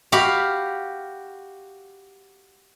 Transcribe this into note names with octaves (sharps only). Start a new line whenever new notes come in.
F#4 G4 F5 B5